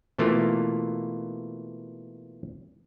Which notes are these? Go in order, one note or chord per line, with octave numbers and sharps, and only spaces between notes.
B2 E3 A3 A#3 F4